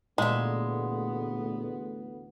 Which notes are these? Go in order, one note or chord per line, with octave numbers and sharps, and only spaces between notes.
A1 D2 A#2 G#3 B3 E5